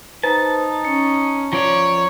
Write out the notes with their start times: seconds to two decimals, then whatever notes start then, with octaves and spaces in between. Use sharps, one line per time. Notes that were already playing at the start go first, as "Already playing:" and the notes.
0.23 D#4 B4 C5 A5 A#5
0.85 C#4 C#7
1.53 F3 C#5 D5 A#5